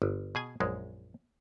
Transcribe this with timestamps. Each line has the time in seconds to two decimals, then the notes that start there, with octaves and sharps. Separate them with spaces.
0.02 G1
0.35 B2 G#4 G#5
0.60 A#1 F#2 G#3